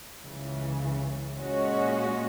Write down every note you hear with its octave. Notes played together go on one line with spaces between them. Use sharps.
C#2 C#3 E3
A#2 G#3 C#4 F#4